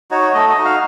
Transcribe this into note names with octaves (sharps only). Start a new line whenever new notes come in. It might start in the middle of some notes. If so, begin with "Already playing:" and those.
D#4 F#4 C#5
A3 D#5
D#5
D#4 F#4
F5